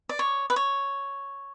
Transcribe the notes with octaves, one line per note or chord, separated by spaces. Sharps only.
D5
C#5
B4
C#5